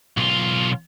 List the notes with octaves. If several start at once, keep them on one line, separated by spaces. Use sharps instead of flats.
B1 F4